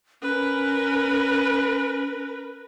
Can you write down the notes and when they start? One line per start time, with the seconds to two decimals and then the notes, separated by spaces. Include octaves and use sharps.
0.22 C#4 A#4 B4